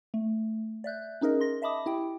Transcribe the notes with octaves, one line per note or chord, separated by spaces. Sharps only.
A3
D5 E5 F#6 G6
C#4 D#4 G#4 A#4 D#5
C6 A#6
D#5 E5 A5 B5 D6 D#6
E4 G4 G5